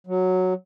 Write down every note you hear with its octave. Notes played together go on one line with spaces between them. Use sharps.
F#3